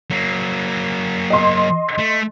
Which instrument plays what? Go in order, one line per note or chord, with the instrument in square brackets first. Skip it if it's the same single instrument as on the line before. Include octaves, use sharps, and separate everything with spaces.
[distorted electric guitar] F#3 A#3
[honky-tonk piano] D#5 C6
[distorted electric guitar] A3